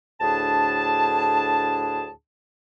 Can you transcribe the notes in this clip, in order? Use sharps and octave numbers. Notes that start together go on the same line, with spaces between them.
D2 A2 D4 G#4 A5